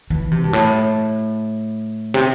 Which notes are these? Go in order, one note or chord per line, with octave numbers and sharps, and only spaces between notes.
E3
C3
G2
A2
C3